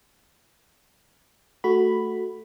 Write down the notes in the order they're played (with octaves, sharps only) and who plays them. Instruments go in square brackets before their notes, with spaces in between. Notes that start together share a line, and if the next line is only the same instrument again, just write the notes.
[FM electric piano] A3 F#4 B5